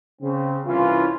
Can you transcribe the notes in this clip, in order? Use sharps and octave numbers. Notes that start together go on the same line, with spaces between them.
C#3 C4
C2 E3 C#4 F4